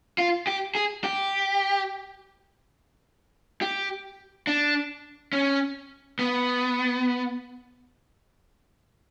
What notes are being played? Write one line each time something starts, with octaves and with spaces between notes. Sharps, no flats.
F4
G4
G#4
G4
G4
D4
C#4
B3